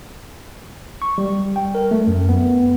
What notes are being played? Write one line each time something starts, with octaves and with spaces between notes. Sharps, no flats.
C#6
G3
G5
A#4
A3
F#2
B3